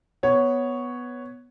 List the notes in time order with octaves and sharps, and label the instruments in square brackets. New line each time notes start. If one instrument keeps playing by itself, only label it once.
[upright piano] B3 C#5